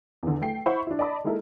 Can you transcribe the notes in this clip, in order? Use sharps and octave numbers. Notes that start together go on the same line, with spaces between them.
E2 D3
A3 G5 C7
E4 C5 F#5 B5 C#6
D4 E4
D5 D#5 A5 B5 D6
G#3 A#3 D#4 E4 A4 A#4